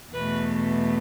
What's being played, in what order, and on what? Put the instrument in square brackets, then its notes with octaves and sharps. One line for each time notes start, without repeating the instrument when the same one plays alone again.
[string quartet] E2 B2 A3 B4